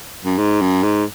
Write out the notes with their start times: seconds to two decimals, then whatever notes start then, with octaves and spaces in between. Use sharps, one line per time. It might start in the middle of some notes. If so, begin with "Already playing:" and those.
0.25 F#2
0.38 G#2
0.61 F#2
0.83 G#2